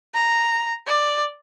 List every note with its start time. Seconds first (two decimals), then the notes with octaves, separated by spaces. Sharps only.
0.14 A#5
0.87 D5